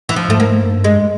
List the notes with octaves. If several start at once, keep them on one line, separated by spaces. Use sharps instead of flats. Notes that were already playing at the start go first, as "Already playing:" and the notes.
E3
F3
G#2 A3
A#3
G2
G#3